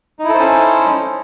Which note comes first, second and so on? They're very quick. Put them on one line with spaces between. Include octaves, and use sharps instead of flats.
D#4 E4 A4 C5 C#4